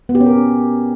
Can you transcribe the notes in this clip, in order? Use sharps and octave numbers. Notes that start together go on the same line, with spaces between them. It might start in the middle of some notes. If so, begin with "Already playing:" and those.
B3
G4
C#4
A#4